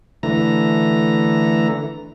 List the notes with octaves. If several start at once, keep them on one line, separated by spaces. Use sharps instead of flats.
D3 E3 A3 A#5